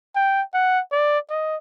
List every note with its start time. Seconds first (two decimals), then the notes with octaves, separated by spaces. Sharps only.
0.16 G5
0.54 F#5
0.92 D5
1.30 D#5